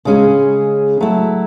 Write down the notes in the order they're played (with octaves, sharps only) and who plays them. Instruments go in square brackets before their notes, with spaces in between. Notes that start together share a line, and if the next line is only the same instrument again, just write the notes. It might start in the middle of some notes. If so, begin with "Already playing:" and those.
[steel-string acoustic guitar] C#3 G#3 C#4 G#4
F#3 A3 E4